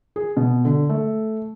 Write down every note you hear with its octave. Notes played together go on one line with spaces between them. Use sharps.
G#4
B2
D3
A3